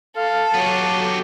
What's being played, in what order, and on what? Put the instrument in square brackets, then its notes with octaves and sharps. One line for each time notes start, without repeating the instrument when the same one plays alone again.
[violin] A4 [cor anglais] F5
[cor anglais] F#3 [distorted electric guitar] B3 G4